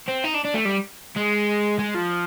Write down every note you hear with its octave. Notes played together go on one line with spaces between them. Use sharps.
C4
D#4
D4
D4
A3
G3
G#3
G#3
F3